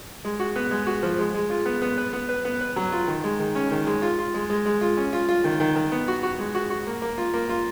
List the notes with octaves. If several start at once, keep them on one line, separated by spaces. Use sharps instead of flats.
G#3
F#4
B3
G#3
F#4
F3
G#3
G#3
F4
B3
B3
B4
B3
B4
B3
B4
F#3
F4
D#3
G#3
D#3
C#4
D#3
G#3
F4
F4
G#3
G#3
G#3
F4
C#4
F4
F4
D#3
D#3
D#3
B3
F#4
F#4
G#3
F#4
F#4
A#3
A#3
F4
A#3
F4